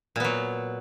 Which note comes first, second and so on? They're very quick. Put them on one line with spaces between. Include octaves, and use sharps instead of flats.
A#2 B3 F#3